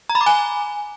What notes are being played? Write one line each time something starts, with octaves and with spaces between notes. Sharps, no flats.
A#5
B5
D6
G#5